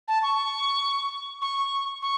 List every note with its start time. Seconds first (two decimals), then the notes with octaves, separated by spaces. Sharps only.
0.08 A5
0.23 C#6
1.42 C#6
2.02 C#6